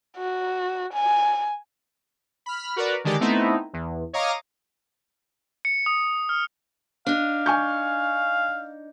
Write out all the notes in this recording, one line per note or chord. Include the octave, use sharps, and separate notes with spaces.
F#4
G#5
B5 F6
F#4 A#4 B4 D5
D3 D#3 G#3 G4 D5
A3 B3 C4 D#4 E4
E2
C#5 D#5 F5 A#5 D6 D#6
C#7
D#6
F6
D4 D#4 F5
G#5 C#6 G6